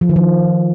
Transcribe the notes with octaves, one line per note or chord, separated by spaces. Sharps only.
F3
D#3
F3